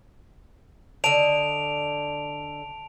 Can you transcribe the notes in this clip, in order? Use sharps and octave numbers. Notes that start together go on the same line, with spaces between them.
D3 D#5 A5 D7 F7